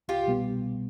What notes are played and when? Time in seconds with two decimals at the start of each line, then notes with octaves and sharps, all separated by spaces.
0.08 C2 F4 G4
0.27 B2 G3 B3